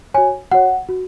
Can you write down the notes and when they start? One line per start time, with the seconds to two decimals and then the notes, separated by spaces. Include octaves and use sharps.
0.14 F#4 C#5 G#5
0.52 F#4 C#5 F#5
0.89 F#4